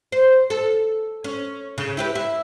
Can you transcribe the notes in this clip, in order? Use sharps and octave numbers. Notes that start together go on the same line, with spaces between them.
C5
A4
C#4
C#3
E4 G4 B4
E4